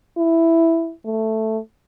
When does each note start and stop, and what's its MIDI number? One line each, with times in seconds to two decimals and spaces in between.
0.17 0.92 64
1.05 1.58 57